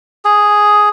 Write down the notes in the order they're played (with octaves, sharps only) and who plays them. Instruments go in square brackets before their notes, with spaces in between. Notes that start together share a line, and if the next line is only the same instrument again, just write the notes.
[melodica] G#4